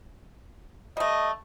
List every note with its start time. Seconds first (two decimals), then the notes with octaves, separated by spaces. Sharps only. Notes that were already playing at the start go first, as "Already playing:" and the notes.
0.97 G3 A3 D#5